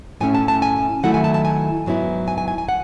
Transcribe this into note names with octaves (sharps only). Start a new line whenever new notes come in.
A2 E3 A3 C#4 E4 G#5
A5
A5
G#5
D#3 F#3 A3 E4 F#5
G#5
A5
A5
G#5
G#2 F#3 B3 E4
G#5
G#5
G#5
G#5
F#5